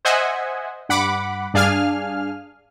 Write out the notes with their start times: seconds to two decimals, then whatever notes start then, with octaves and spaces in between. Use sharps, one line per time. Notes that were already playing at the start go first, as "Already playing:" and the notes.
0.05 C5 D#5 E5 F#5 G#5
0.89 G2 F#5 B5 D6
1.54 G2 D4 G#4 F5 G#5 F6